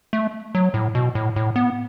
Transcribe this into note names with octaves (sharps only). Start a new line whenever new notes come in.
A3
F#3
A2
B2
A2
A2
B3